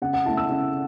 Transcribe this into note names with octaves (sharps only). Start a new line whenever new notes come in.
C#3 F#5
F#5
A3 E4 A5
E6
C#3